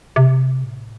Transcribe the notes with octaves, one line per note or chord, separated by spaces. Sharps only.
C3
A2